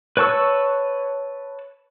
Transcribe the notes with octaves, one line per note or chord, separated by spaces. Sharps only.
B4 C#5 A5 C#6 E6